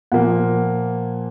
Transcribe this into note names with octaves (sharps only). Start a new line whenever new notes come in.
A#2 F3 A#3 F#5